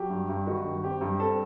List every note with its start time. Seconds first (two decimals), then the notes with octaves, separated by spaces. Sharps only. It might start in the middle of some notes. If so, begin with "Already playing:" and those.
Already playing: F#3 G4
0.10 G2
0.29 G2
0.47 D#3 F#4
0.65 G2
0.83 C4 G4
1.01 G2
1.19 C4 A4